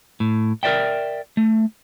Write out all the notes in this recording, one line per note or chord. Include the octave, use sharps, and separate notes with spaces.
A2
A#4 B4 D5 E5 G5
A3